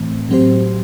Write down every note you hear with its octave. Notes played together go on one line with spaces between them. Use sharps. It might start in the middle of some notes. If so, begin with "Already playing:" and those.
Already playing: A2 E3 A3 C4
A2 F#3 C4 G4 C5